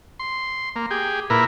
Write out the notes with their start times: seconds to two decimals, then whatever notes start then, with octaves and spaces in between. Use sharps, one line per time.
0.19 C6
0.76 A#3
0.91 G4 G#4
1.30 A#2 E4 A#4 B4